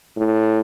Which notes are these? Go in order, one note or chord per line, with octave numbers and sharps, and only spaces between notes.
A2